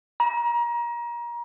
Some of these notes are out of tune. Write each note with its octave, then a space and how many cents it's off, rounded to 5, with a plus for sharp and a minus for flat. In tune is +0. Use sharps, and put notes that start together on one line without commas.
A#5 +30